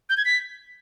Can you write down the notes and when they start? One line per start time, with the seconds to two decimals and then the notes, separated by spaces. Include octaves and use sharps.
0.10 G6
0.17 G#6
0.25 B6